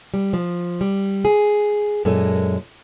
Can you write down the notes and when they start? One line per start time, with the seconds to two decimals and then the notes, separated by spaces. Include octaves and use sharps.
0.14 G3
0.33 F3
0.81 G3
1.25 G#4
2.05 F#2 A#2 G#3 A4